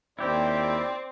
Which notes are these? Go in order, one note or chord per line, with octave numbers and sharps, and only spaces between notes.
D#2 C4 E4 G4 D5